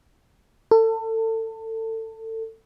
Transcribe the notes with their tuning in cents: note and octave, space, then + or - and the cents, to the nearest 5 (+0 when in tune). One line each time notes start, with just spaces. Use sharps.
A4 +25